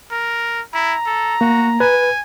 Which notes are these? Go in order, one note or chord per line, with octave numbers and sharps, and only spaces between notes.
A#4
E4 A#5
A4
A#3 F#4
B4 G#5